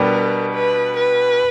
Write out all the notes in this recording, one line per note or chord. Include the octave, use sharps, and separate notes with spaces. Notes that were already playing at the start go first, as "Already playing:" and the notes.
Already playing: B2 G3 B3 D4 G4 A#4
B4
B4